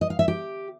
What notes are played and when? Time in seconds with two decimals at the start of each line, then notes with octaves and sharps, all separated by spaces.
0.01 D#5
0.10 F5
0.19 E5
0.28 G4